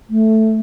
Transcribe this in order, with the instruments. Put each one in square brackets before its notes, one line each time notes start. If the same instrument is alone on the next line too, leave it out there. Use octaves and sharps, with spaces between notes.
[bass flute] A3